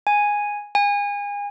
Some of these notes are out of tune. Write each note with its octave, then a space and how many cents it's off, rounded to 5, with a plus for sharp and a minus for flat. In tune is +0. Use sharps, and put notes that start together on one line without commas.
G#5 -5
G#5 -30